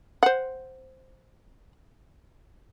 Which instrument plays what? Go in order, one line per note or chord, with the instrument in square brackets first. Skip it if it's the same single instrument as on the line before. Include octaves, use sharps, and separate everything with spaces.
[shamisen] C5 F#5